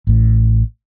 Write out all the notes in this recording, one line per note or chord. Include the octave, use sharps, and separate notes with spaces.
A1 A2